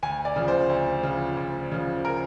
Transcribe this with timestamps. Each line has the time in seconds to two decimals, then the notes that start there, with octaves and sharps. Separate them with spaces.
0.03 D2 G#5
0.25 D5
0.36 C#3 F3
0.48 C5
0.70 D2
1.03 C#3 F3
1.37 D2
1.72 C#3 F3
2.05 A#4